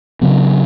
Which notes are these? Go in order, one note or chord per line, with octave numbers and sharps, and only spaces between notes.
C#3 F#3 B3